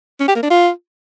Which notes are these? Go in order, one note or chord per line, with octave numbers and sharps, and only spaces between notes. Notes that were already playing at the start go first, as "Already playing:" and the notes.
C#4
G4
A#3
D4
F4